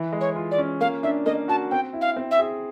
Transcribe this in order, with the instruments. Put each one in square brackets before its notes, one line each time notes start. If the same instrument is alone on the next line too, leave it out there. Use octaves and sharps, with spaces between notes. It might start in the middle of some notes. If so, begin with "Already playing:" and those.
Already playing: [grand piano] E3
G#3
[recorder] C#5
[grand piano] F4
[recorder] D5
[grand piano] C#4
[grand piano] A#3 [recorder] F5
[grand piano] D4 [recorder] E5
[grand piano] A#3 [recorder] D#5
[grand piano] F#4 [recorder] A5
[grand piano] C4 [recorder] G5
[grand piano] E4
[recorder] F5
[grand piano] C4
[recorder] E5
[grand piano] G#4